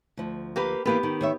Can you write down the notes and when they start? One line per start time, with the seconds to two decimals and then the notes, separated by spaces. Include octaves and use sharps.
0.17 D2 F3
0.56 A#3 G4 B4
0.86 E3 A#3 B3 G4 B4
1.03 D#3
1.21 D#3 C#5 E5